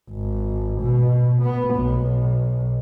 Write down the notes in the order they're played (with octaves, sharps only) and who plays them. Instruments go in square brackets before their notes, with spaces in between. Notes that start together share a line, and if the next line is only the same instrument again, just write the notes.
[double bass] G#1
B2
B3
B1